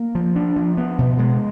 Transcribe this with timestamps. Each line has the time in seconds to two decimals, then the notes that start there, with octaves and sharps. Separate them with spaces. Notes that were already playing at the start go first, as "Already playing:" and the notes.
Already playing: A#3
0.15 F3
0.36 D4
0.56 F3
0.77 B3
0.98 B2
1.19 G#3